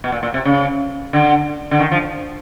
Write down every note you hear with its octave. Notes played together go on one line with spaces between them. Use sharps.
B2
A#2
A#2
C3
C#3
D3
D3
D#3
F3